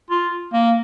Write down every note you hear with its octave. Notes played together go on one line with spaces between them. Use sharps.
F4
A#3